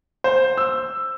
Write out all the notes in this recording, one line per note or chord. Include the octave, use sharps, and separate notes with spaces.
C5
E6